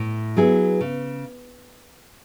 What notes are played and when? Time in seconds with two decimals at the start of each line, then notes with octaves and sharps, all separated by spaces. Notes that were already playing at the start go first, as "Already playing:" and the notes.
Already playing: A2
0.37 F#3 B3 E4 G#4
0.81 C#3